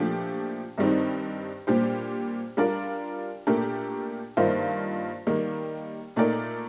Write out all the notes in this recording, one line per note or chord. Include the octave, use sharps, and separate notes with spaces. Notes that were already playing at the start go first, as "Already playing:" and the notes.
Already playing: A#2 F3 A3 D4 G4
G2 D#3 G3 C4 D#4
A#2 G3 D4 G4 C5
G3 D4 F4 A#4 D5
A#2 A3 D4 G4 A#4
G2 D#3 A#3 F4 C5
D#3 G3 A#3
A#2 A3 D#4 A#4 D5